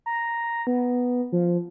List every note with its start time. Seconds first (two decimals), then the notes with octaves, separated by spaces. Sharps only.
0.06 A#5
0.67 B3
1.32 F3